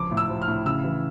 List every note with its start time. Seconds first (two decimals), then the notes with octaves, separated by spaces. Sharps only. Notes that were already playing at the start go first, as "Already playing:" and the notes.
Already playing: C#2 F3 D6
0.11 A2
0.17 E6
0.29 F3
0.42 F6
0.48 A2
0.66 C#3 E6
0.84 E3